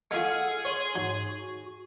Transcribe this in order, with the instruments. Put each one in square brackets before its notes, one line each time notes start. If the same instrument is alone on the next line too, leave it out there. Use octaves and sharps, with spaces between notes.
[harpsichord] G#3 F4 [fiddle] G#4 [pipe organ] A4 F#5 F6
[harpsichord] C#5 [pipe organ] C6
[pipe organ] G#2 [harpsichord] F#3
[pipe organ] F#4